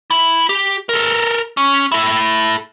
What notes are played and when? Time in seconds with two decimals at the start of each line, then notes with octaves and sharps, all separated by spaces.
0.11 E4
0.49 G4
0.89 A4 A#4
1.57 C#4
1.92 E4 A4